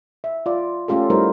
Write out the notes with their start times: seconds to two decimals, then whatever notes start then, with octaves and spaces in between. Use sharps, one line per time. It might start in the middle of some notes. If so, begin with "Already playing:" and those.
0.24 E5
0.46 F4 D5
0.88 A3 C#4 F4 G4 A4
1.10 G3 A3 D#4 E4 A#4 C5